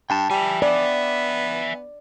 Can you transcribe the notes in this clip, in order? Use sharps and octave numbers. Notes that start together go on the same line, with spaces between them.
G2 G5 A5
G3 E5 G#5
B3 D5